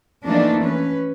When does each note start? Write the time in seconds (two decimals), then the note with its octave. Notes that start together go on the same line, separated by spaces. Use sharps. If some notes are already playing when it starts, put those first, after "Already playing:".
0.24 E3 F3 A3 A#3 D4 D#4
0.62 C#4 B4